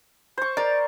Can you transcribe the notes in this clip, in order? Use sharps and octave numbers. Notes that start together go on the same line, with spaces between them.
C5 C#6
A#4 D5